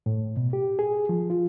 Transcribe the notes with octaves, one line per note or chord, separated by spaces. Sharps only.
A2
B2
G4
G#4
F3
F4